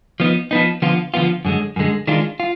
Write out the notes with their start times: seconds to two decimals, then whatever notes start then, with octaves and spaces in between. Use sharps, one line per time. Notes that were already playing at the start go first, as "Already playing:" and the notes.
0.20 F3 B3 D#4
0.51 F3 B3 D#4
0.82 D3 F3 B3 F4
1.14 D3 F3 B3 F4
1.45 F#2 D3 G#3
1.76 F#2 D3 G#3
2.07 D#3 G#3 D4 F4
2.40 F4